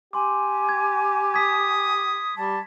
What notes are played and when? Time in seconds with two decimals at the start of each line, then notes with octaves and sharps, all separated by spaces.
0.13 G4 G#5 C6 D6
0.69 G#6
1.34 D#6 G#6 B6
2.36 G3 A5